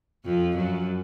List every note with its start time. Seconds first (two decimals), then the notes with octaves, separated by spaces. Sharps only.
0.25 F2 F3
0.56 F#2 F#3